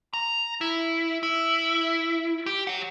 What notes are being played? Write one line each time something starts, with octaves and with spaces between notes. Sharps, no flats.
A#5
E4
E4
G4
C#5 F#5